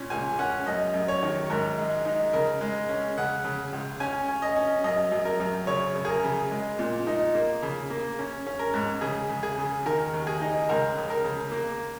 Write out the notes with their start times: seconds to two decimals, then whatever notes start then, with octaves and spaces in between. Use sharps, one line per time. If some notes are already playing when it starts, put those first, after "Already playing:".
Already playing: A#2 C#4
0.10 C#2 G#5
0.39 C#4 F#5
0.66 F#2 D#5
0.94 F#2
1.08 C#5
1.23 D#3
1.50 G#2 A#4
1.78 G#3
2.05 D#4
2.33 C#3 A#4
2.61 G#3
2.89 C#4
3.17 C#3 F#5
3.44 C#3
3.73 C#2
4.00 C#4 G#5
4.28 C#4
4.42 D#5
4.56 C#4
4.84 F#2 D#5
5.12 F#2
5.25 A#4
5.40 F#2
5.67 C#3 C#5
5.95 C#3
6.05 G#4
6.09 A#4
6.24 C#3
6.51 G#3
6.79 A#2
7.07 D#4
7.35 A#3
7.62 C#3
7.90 A#3
8.19 C#4
8.47 C#4
8.59 A#4
8.74 G#2
9.01 C#3 G#4
9.29 C#3
9.43 G#4
9.58 C#3
9.86 D#3 A#4
10.14 D#2
10.27 G#4
10.41 D#4
10.69 C#2 A#4
10.97 C#3
11.10 A#4
11.24 C#3
11.52 A#3